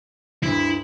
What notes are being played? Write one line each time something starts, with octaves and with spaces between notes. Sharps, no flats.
D2 G2 E4